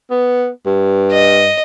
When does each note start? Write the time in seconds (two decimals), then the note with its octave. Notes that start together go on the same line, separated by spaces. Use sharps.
0.10 B3
0.66 G2
1.11 D#5